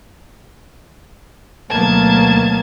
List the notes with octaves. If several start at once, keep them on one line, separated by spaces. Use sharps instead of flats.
D2 B2 F#3 A#3 A5 G#6